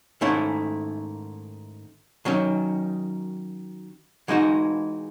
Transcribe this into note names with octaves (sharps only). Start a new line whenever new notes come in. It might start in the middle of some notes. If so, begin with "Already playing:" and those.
G#2 D#3 A3 C#4 E4
D#3 F#3 C#4
E3 G#3 D#4 F#4